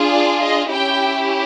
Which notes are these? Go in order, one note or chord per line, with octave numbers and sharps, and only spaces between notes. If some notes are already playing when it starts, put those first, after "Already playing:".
Already playing: D4 F4 G#4
D5
D#5
C#4 E4 G4 G5